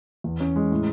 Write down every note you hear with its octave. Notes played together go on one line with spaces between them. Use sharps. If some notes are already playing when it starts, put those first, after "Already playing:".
E2
C#4
G#3
A2